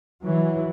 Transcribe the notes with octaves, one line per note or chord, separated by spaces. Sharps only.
E3 F#3